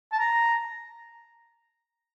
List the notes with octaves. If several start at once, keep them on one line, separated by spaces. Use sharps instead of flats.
A5
A#5